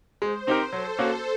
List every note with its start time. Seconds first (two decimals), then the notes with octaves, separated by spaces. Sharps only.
0.22 G#3 C5
0.47 C4 D#4 G4 A#4
0.72 F#3 A4
0.99 A#3 C#4 F#4